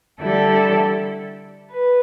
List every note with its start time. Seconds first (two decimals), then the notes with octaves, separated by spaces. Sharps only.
0.20 D3 G3 E4 A4 D5
1.71 B4